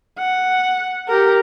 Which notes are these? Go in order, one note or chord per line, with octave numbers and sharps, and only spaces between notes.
F#5
G4 A#4